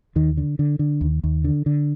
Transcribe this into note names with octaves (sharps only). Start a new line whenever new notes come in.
D#2 D#3
D3
D3
D3
D#2
D#2
D3
D3